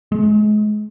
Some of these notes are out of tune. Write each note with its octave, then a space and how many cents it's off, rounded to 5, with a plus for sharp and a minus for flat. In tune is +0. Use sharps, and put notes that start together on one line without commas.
G#3 +30